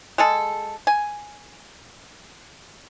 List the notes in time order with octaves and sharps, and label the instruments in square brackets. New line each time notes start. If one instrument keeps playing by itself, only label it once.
[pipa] G#3 G#4 A4
G#5